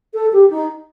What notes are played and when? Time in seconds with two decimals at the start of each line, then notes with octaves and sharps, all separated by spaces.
0.13 A4
0.32 G4
0.50 D#4